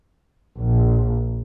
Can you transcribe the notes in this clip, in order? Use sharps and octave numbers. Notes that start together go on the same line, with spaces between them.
A#1